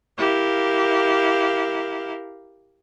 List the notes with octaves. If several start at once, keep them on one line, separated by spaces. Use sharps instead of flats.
E4 G4 A#4 F5